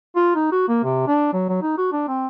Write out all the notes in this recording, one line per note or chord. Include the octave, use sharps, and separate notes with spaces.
F4
D#4
F#4
A#3
C3
D4
F#3
F#3
D#4
F#4
D4
C4